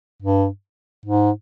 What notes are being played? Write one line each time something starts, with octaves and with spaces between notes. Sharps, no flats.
G2
G#2